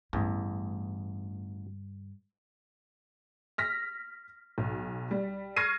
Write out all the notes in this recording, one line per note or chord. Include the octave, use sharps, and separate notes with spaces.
A1 E2 G2 D3
F6 A#6 B6
B1
G3
C#6 F6 G#6 A#6 C7 D#7